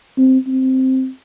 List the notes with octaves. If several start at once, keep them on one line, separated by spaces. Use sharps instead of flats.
C4
C4